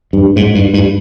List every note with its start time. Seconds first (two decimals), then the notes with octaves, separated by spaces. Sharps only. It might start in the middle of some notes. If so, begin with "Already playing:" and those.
0.13 G2
0.36 G#2
0.55 G2
0.74 G2